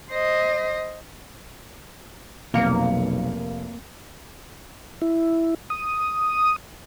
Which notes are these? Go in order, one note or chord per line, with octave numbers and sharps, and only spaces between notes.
C5 D#5
F1 B1 A#3 F5 C#7
E4
D#6